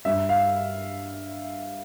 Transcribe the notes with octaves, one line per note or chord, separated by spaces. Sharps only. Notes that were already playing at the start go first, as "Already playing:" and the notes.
G2 G3 E5
F5